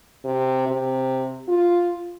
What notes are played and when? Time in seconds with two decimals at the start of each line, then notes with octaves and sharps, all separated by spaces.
0.24 C3
0.68 C3
1.48 F4